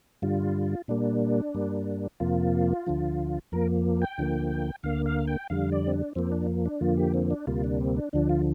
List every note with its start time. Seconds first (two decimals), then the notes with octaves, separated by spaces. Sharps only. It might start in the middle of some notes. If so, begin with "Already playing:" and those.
0.22 G2 D3 G3 F4
0.88 A#2 G3 A#3 D4
1.54 G2 G3 A#3
2.20 F2 C3 F3 A#3 F4
2.87 D2 D3 F3
3.52 F2 F3 A#3 A#4
4.02 G5
4.18 D2 D3 F3 A#3
4.83 D2 D3 A#3 F5
5.06 F5
5.27 G5
5.50 F2 D3 G3 F5
5.72 D5
5.87 C4
5.93 D4
6.15 F2 F3 A#3 C4
6.32 D4
6.66 D4
6.81 F2 D3 F3 A#3 F4
6.97 G4
7.14 C4
7.31 D4
7.47 D2 C3 G3 A#3 F4
7.64 D4
7.80 C4
7.97 D4
8.13 D2 D3 F3 D4
8.29 F4